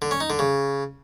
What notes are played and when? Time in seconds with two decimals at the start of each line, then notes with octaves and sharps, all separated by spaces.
0.02 D3
0.11 C#4
0.20 D#4
0.30 D3
0.39 C#3